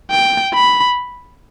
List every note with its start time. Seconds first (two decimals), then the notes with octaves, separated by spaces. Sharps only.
0.11 G5
0.53 B5